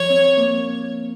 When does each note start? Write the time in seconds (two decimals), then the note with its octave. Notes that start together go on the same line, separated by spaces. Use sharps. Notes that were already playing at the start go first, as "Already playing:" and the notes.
Already playing: F3 C#5
0.10 C4
0.37 A#3